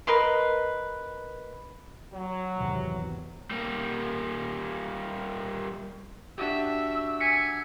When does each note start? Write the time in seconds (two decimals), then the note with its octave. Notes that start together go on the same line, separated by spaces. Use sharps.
0.07 A#4 B4 D#5 C6
2.14 F#3
2.57 G#1 E2 C3
3.51 G3 A#3
6.38 D4 F#4 G4 E5 E6
7.21 G#5 B6 C#7